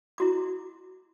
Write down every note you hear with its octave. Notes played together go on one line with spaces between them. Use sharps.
E4 F#4 D6